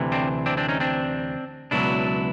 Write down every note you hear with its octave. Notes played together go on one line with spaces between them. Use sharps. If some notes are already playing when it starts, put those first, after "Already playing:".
Already playing: D2 C3 E3
C4 D4
C4 D4
C4 D4
C#4 D#4
C4 D4
C#2 B2 F#3 D4 E4